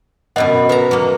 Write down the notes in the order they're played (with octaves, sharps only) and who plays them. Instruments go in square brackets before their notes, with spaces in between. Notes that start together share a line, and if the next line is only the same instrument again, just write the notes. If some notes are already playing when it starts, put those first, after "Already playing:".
[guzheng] F#2 B2 B3 [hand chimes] D#5 F#5
[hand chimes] B4 [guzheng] E5 A5 A#5
[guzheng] F#3 A#3